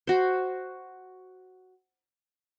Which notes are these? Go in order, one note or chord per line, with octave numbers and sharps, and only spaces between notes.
F#4 C5